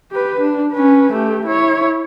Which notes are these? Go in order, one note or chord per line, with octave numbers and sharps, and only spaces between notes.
G4 B4
D4
C#4 B4
A3 G4
E4 C#5